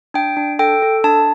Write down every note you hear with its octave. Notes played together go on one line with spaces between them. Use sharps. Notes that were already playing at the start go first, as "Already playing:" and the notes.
D4 G5
D4
A4 G5
A4
D4 A5